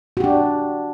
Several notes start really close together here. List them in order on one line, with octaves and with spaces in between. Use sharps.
F#4 G4 D4